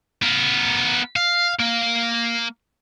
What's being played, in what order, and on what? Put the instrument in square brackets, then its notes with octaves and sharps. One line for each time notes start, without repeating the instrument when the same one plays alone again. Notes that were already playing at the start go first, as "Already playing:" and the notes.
[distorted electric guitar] B3 A#4
F5
A#3